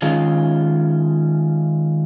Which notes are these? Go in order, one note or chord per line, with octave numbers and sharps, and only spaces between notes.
D#3 G#3 C#4 F4